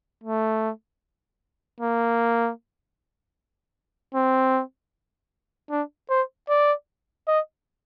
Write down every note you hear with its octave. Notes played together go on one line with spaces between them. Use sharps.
A3
A#3
C4
D4
C5
D5
D#5